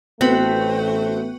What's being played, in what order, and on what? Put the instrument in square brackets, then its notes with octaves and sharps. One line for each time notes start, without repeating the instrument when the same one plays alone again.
[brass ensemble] A1 A3 [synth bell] B3 F#4 B4 [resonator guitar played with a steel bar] C4